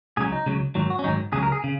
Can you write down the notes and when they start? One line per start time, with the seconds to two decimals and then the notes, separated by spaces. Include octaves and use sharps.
0.17 C#2 C#3 F#3 G#4
0.32 D#4
0.46 C#2 C#3 F#3
0.75 G#2 D#3 F#3
0.90 F#4
0.99 C#4
1.04 G#2 D#3 F#3 D#4
1.33 C#2 C#3 F#3 G#4
1.42 A#4
1.52 G#4
1.64 C#3